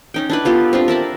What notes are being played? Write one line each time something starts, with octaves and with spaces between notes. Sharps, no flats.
C#4 D#4 G5
D4 E4 B4
B3 F4 G4 A4
C4 D4 F4
A#4 E5 A5 B5